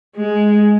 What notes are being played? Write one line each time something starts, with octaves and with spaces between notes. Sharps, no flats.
G#3